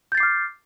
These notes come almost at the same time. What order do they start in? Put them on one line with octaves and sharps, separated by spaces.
G6 A6 C7 D6 F6